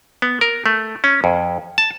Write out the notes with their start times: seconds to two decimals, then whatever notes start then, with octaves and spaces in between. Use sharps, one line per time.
0.22 B3
0.41 A#4
0.66 A3
1.04 C#4
1.24 F2
1.78 A5